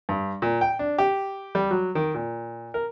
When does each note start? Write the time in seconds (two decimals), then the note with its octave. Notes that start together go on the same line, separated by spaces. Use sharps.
0.09 G2
0.42 A#2
0.61 G5
0.79 D4
0.98 G4
1.55 G3
1.71 F#3
1.95 D#3
2.14 A#2
2.74 A#4